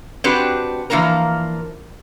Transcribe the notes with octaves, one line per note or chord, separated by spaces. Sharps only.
C4 D4 F#4 G4 B4
E3 F3 A#3 D4 A#4